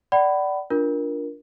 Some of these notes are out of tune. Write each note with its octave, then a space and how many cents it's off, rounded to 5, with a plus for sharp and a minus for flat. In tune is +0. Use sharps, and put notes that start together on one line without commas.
D5 -5 F#5 +35 B5 +10
D4 +0 F4 +0 A#4 +15